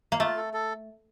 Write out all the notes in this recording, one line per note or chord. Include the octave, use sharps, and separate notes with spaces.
A#3
A3 F4
A4
A4